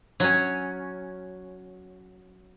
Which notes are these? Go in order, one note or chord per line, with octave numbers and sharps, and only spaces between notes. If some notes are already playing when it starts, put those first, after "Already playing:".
F#3 C#4